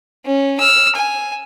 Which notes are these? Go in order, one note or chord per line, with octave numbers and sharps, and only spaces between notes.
C#4
E6 F6
G#5